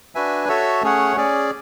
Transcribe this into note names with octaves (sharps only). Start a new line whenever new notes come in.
D4 F#4 B4 E5 G#5
F#4 A4 C#5 E5
A3 C#4 G#4 C#5 F#5
C#4 G#4 D5